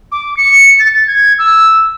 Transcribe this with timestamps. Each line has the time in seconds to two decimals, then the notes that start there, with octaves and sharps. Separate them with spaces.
0.12 D6
0.37 C#7
0.79 A6
1.07 G#6
1.39 E6